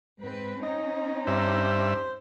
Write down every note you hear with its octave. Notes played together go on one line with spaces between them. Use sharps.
G#2 C4 B4
C4 C#4 D#4 D#5
G2 C5 E5